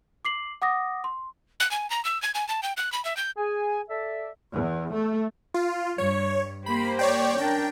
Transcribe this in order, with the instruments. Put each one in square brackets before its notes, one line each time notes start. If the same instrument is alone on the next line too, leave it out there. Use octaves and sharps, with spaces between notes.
[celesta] D6 C7 F#7
F#5 D6 D#6 A#6
C6
[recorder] F#6
G#5
A#5
E6
G#6
G#5
A5
G5
F#6
B5
E5
G6
[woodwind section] G#4 G#5
A4 D5 E5
[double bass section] E2
A3
[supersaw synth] F4
[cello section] G2 [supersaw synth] C#5
[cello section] A#3 G4 C5 [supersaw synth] B5
[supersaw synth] C#5 D5 G5
[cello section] C#4 D4 A#4 [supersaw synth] G5